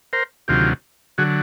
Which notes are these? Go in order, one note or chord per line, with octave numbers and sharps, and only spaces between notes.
A#4 C5
D2 C3 D#3 F#3 F4 G4
D3 F#3 F#4 G#4